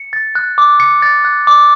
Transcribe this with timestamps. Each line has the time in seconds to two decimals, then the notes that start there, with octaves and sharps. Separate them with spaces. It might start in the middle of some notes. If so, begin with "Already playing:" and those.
Already playing: C#7
0.13 A6
0.35 F#6
0.58 D6
0.80 C#7
1.02 A6
1.25 F#6
1.47 D6